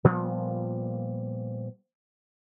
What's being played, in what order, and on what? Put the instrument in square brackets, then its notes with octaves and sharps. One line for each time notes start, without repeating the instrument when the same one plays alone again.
[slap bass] A#2 F3 G3 B3